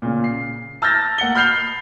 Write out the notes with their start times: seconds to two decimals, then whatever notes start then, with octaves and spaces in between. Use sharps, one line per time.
0.02 A#2 C#3
0.24 C7
0.82 A5 E6 F6 G6 A6 A#6
1.18 A#3 F#5 C#7 G7
1.35 B5 F6 G6 C7 F7 G7